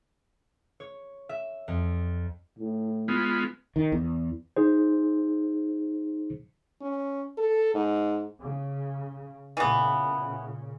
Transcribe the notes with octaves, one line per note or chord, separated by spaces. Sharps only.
C#5
E5
F2
A2
G#3 B3 F4
D#3
E2
D#4 G#4 C5
C#4
A4
G#2
C#3
A#2 C#3 E3 B3